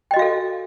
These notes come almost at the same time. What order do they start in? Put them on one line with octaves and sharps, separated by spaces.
G5 D#5 F#4 F5 A4